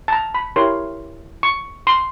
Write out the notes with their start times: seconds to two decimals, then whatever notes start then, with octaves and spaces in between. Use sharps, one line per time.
0.08 A5
0.12 A#5
0.34 B5
0.56 E4 G4 A#4 C#5 C6
1.43 C#6
1.87 C6